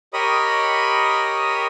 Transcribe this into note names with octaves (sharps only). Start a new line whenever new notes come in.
G4 A#4 C#5 D#5 B5 D#6